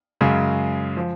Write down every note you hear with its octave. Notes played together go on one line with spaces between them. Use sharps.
F#2 C#3 G#3
F3